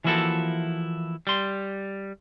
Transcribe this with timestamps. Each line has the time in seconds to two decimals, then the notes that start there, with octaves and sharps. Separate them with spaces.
0.04 E3 F3 A#3 E4 F#4 A4
1.27 G3 C6